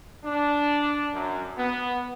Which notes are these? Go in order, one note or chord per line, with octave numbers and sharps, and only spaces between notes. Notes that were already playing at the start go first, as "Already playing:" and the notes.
D4
F#2
B3